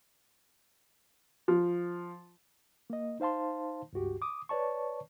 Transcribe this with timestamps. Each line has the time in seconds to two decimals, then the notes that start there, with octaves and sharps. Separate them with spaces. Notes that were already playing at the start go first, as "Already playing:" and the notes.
1.48 F3
2.90 A#3 D#5
3.20 D#4 C5 F5 A5 C6
3.93 C#2 G2 F#4 G4
4.22 D6 D#6
4.49 B4 C#5 D5 A5 C#6